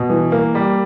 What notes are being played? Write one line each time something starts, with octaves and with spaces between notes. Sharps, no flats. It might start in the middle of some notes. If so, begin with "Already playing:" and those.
Already playing: B2
E3
A#3
G3